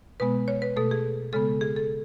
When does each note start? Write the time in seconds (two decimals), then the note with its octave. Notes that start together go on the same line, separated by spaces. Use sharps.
0.20 B2 G#3 B3 B4
0.48 C#5
0.62 B4
0.76 B2 A3 A4
0.91 G#4
1.33 C#3 G#3 B3 A4
1.61 G#4
1.76 A4